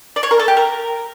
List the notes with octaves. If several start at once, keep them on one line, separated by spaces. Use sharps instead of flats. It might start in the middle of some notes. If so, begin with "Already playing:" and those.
D5
C#5
A#4
A4
G4
A#4